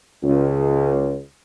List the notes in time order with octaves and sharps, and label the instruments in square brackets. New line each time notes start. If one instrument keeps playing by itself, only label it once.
[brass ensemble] C#2